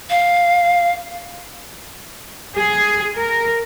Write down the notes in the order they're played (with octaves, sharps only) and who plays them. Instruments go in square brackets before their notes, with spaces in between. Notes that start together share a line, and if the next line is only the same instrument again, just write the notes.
[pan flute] F5
[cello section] G#4
A#4